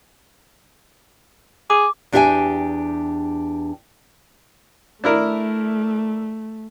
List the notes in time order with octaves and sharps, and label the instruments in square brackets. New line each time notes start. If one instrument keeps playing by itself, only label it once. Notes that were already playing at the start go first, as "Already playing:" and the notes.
[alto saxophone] G#4 [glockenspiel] D6
[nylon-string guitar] E2 D4 G4 E5 G5 G#5
[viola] A3 [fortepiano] D4 E4 A#4